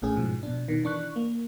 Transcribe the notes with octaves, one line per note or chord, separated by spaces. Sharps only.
A1 A2 C#4 G#4
G#2 B2 F3
B2 D4
B2 D#3
E3 D4 C#6 F#6
A#3